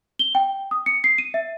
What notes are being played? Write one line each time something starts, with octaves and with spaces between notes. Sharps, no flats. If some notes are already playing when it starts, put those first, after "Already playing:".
G7
G5
D#6
C#7
C7
D#7
E5